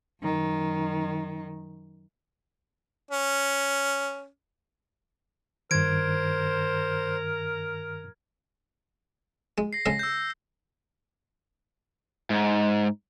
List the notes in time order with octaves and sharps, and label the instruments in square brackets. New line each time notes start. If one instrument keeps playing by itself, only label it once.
[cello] F#2 D#3
[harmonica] C#4
[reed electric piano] G2 D#3 [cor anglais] A#4 [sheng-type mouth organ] C5 [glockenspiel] G#6 D7
[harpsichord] G#3
[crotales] A#6 C7
[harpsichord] C#3 G#3 A4 [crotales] A#6
[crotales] E6 G6
[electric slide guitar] G#2